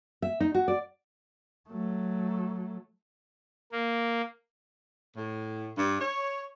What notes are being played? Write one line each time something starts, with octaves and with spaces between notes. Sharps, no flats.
E5
D#4
F#4
D5
F#3 A3
A#3
A2
G2
C#5